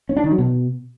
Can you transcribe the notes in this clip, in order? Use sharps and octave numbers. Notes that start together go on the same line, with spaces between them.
C#4
D4
D#3
F#3
B2